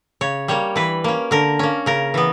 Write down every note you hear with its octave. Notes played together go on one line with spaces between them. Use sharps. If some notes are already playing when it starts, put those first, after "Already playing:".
C#3 C#5
G3 A#3 C#5
E3 B4
A#3 C#4
D3 A#4
A#3 C#4
C#3 A#4
E3 B3